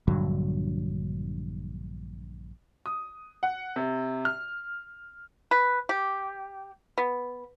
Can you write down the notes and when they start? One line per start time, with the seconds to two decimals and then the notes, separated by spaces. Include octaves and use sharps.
0.08 A#1 G2 D3 F#3
2.86 D#6
3.43 F#5
3.76 C3
4.25 F6
5.51 B4
5.89 G4
6.98 B3